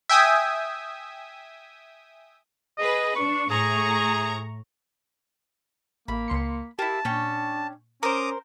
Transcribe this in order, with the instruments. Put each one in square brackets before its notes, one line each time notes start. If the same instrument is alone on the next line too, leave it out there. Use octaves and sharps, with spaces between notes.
[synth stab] E5 G5 G#5 D#6
[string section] G#4 B4 [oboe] D#5
[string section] D4 [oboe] C#6
[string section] A2 A#5 C#6 [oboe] G#4
[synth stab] A1 [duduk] A#3 [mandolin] B5
[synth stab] C#2 C6 C#7
[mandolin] A#3 E4 [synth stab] G4 [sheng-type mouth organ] A5
[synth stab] A#2 [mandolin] C#4 G5 C#6 [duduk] D4
[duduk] C#4 [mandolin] A#4 C5 [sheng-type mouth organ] A#5 D6 D#6